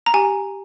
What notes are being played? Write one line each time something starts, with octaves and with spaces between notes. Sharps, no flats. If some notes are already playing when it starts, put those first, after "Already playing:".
A#5
G4 G#5